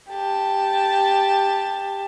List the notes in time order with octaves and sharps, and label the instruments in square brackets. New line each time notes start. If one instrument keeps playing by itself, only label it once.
[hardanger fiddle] G4 A5